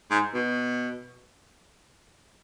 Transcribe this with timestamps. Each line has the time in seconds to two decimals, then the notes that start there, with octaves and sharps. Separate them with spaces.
0.11 G#2
0.34 B2